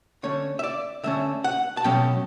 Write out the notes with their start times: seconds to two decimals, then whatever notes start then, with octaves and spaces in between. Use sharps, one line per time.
0.23 D3 A3 C#4 C#5
0.59 E5
0.64 D5
1.04 D3 A3 C#4 E5
1.44 F#5
1.77 A5
1.84 B2 F#3 A3 C#4 G5